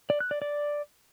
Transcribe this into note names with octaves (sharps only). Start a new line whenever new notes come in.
D5
F#6
D5
D5